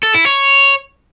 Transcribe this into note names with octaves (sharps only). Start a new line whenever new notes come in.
A4
E4
C#5